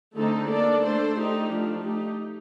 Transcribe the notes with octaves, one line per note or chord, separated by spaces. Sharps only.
D3 A3 C4 D#4 A4
A#3 D4 A4 D5
A3 D4 A4 C5
A3 D#4 G4
F3 A3 D4
A3 D#4 G4